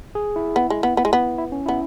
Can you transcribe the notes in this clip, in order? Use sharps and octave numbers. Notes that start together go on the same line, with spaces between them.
G#4
E4
B3
G#3
B3
B3
G#3
B3
E4
C#4
E4
B3